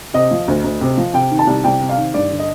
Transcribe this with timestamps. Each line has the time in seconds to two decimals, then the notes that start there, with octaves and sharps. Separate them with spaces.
0.14 C3 D#5
0.31 F3
0.48 D2
0.64 D2
0.81 C3
0.97 F3
1.14 C3 G5
1.31 D#3
1.39 A5
1.47 C2
1.64 C2 G5
1.80 C3
1.89 F5
1.97 D#3
2.14 G2 D5
2.31 D3
2.39 D#5